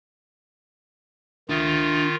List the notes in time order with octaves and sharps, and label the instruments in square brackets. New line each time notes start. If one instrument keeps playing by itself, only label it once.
[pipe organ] D#3 F4 [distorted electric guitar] D4 E5